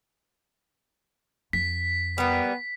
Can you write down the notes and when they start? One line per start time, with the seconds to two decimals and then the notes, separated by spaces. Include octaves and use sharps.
1.53 F2 B6
2.18 G3 A#3 B3